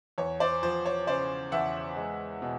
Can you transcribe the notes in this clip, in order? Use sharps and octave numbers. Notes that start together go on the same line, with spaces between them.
E2 C#5
C5 D5
F3 C5
C#5
C#3 C5 D5
E2 E5 F#5
G#3
B2